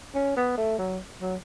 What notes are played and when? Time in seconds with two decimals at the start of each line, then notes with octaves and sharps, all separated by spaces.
0.15 C#4
0.37 B3
0.58 A3
0.79 F#3
1.21 F#3